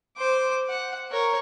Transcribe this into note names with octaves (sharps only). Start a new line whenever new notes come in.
C5 D6
F#5
A#4 C#5